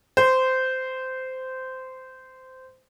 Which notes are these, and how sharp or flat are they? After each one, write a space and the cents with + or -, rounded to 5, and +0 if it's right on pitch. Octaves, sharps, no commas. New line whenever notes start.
C5 -15